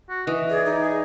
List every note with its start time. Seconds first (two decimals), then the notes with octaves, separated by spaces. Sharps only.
0.10 F#4
0.27 E3 D#5
0.50 G#4 D5
0.66 D#4
0.81 G#4